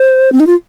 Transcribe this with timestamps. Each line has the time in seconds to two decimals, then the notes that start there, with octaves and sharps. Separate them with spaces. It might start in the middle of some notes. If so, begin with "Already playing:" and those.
Already playing: C5
0.32 C4
0.40 D#4
0.47 F4